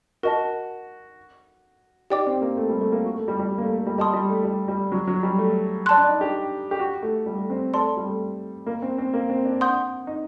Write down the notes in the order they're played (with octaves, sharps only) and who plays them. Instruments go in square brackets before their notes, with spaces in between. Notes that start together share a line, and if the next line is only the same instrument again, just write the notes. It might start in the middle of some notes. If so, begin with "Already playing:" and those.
[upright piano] F#4 [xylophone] A#4 D#5 A5
[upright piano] D#4 [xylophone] G4 D5 G5 D6
[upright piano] C4
A#3
A3
G3
A3
A#3
F#4
A3
G3
G3
A#3
A3
A3
G3
[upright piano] G3 [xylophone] D#5 A5 C6 D#6
[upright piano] G3
A3
G3
G3
F#3
F#3
G3
A3
[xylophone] D5 A5 C6 F#6
[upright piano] D4
D#4
G4
G4
F#4
A3
G3
A3
C4
[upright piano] A3 [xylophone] A4 D5 A5 C6
[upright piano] G3
A3
A#3
C4
C4
A#3
C4
D4
[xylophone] F#5 C6 D#6 G6
[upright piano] D#4